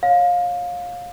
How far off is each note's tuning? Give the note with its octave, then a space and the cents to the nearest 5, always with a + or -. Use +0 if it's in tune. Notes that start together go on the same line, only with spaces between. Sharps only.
C#5 +0 F5 +20